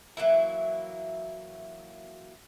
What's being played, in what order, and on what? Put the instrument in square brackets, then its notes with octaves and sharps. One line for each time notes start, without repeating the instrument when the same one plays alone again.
[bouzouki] E3 F#3 A#3 E4